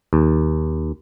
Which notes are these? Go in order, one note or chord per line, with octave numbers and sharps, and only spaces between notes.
D#2